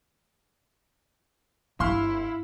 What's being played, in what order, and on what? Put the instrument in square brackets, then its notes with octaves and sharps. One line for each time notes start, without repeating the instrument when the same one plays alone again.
[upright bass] G1 [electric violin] E4 [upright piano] F5 C6 F6